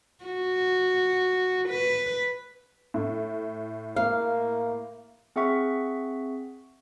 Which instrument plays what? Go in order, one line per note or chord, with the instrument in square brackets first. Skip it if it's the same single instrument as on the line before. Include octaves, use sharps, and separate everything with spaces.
[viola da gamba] F#4
B4
[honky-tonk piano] A2
[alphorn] A#3 [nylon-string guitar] F5
[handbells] C4 G#4 E5 F#5 C#6 B6